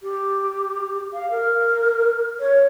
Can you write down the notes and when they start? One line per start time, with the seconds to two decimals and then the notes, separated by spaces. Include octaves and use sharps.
0.02 G4
1.13 F5
1.30 A#4
2.39 C#5